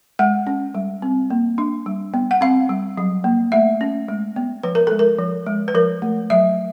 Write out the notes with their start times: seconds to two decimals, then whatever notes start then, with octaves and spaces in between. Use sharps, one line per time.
0.19 G#3 F#5
0.47 C#4
0.75 G3
1.02 C4
1.30 A#3
1.58 D4
1.86 G3
2.14 B3
2.31 F#5
2.41 C4 F5
2.69 G3
2.98 F#3
3.24 A#3
3.52 A3 E5
3.81 C#4
4.08 G#3
4.36 B3
4.63 F3 B4
4.75 A#4
4.87 G#3 A4
4.99 A#4
5.19 F3
5.46 G#3
5.68 B4
5.74 F3 A#4
6.02 A3
6.30 F#3 E5